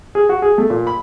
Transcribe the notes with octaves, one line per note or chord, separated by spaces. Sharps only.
G#4
F#4
G#4
A3
A#2
B5